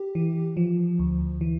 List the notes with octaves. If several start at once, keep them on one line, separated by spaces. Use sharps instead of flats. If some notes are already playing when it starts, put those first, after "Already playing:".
Already playing: G4
E3
F3
D2
E3